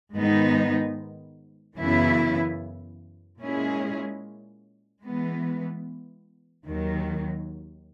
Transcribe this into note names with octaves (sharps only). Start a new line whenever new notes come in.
G#2 D#3 G#3 B3 D#4
F#2 C#3 E3 B3 E4
A#2 G#3 C#4 E4 G#4
E3 G#3 B3
D#2 D#3 F#3